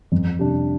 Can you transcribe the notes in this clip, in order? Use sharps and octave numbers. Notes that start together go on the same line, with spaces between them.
F2
C3 G3 D4